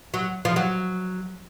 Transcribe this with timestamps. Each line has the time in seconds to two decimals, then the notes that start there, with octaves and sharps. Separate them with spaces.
0.14 F#3
0.45 F3
0.56 F#3